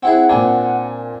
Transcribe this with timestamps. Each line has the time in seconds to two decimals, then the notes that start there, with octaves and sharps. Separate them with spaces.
0.03 C4 E4 G#4 F#5
0.29 A#2 C4 D4 G#5